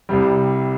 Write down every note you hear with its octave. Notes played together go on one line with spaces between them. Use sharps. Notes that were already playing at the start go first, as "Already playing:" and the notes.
C2 C3 G3